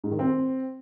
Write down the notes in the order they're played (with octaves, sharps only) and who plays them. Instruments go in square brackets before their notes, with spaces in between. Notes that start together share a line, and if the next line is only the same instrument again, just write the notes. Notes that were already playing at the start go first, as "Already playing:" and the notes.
[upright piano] G#2
D#3
C4